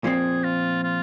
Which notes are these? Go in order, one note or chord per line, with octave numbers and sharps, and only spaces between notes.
A#2 F3 C4 G#4
F4
F4